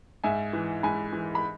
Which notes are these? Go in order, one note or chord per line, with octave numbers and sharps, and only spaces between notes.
G#2 E5 G#5
E3
G#2 G#5 B5
E3
B5